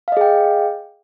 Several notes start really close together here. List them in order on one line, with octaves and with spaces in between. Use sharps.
F5 D#5 G#4 G5